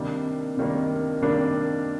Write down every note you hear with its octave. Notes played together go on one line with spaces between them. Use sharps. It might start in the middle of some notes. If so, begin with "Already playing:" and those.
Already playing: C3 D#3 G3 A#3 D4
C3 D#3 G3 A#3 D4
C3 D#3 G3 A#3 D4